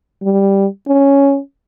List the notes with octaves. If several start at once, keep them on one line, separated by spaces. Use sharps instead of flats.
G3
C#4